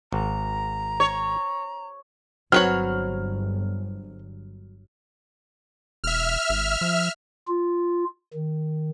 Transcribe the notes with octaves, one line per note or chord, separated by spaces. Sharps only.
G#1 A#5
C#5
G1 F#3 C4 B4 C#5 F6 F#7
E1 E5 F6
G#1
F3
F4
D#3